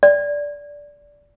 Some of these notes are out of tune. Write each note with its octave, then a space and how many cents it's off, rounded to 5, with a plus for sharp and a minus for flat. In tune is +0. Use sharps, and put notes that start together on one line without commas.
D5 -10